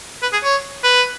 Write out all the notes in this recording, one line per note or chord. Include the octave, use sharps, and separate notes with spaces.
B4
G#4
C#5
B4